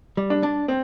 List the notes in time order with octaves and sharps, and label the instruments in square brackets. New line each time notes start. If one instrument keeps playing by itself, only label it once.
[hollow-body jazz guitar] G3
[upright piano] D4
[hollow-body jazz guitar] D4
[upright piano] C4